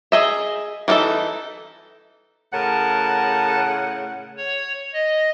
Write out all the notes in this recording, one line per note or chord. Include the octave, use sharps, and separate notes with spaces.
G#4 D#5 E5
E3 A#3 D#4 A4 E5
A2 C#3 A#4 F#5 A5
C#5
D#5